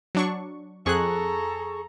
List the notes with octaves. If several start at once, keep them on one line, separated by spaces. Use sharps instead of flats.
F#3 D4 C#6
F2 G#4 A4 A#5 C#6 F#6